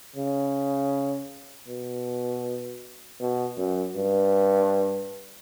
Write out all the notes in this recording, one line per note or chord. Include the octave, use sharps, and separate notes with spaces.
C#3
B2
B2
F#2
G2